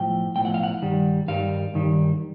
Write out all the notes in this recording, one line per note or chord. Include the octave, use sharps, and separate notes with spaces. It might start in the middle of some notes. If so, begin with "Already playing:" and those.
Already playing: B1 A2 F3 G5
B1 A2 F3 G5
F#5
F5
F#5
G2 D#3 G3
G2 D#3 G3 F5
G2 D#3 G3